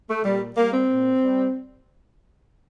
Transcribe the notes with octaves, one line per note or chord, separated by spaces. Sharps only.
A3
A#2 G3
G3 A#3
C4
A#2
G3